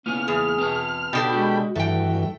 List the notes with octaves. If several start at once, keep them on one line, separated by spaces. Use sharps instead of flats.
A#3 B3 C#4 E4 F6
E2 G#4
C4 B4 A5
B2 D4 F#4 G4 A4 G5 B5
G#3 F#4
G2 E3 G3 A3 F#4 G5